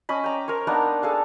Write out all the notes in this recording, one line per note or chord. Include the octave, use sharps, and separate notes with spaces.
C#4 D#5 B5
G5 A#5 D6
A#4 C5 C#5
A#3 B3 D4 D#4
G#4 A4 F5 A5